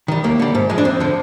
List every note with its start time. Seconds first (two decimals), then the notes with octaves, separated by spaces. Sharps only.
0.08 D#3 G3
0.24 D#2 A#3
0.39 D3 G3
0.55 G#2
0.70 F3 G#3
0.78 D4
0.85 F2 C4
1.00 D3 F3